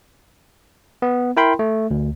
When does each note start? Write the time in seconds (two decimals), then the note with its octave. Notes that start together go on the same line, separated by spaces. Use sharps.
1.02 B3
1.37 E4 A#4 G5 B5 C6
1.59 A3
1.91 D2